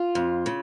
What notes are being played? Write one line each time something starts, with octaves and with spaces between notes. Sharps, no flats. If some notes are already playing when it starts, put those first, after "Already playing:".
Already playing: F4
F2
C#3